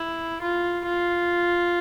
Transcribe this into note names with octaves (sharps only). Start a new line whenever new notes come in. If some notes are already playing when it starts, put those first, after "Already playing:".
Already playing: E4
F4
F4